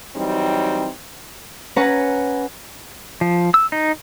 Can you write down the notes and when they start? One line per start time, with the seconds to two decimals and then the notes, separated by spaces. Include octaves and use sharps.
0.15 E3 F#3 G3 C4 D#4
1.76 C#4 B4 F#5 A#5
3.21 F3
3.54 E6
3.72 D#4